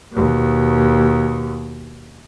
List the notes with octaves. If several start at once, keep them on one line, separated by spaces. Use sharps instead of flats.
D#2 B2